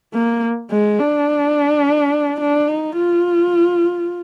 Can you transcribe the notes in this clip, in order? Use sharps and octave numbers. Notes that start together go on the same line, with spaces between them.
A#3
G#3
D4
D4
D#4
F4